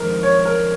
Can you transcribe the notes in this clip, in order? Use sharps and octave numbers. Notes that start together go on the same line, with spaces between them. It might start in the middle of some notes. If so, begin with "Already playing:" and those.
Already playing: F2 D#3 G#3 C4 A#4
C#5
A#4